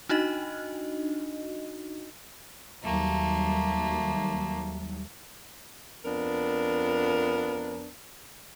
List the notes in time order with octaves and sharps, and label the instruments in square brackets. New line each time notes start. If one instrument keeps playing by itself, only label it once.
[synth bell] D4 D#4 F#4 D#5
[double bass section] D#2 F#3 G3 [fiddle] A3 A#3
[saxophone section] F2 B3 D4 A#4